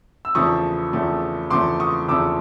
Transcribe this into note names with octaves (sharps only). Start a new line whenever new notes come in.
E6
E2 C#3 F3 A3 C#6 D#6
E2 C#3 F3 A3
E2 C#3 F3 A3 C6 D6
C#6 D#6
E2 C#3 F3 A3 D6 E6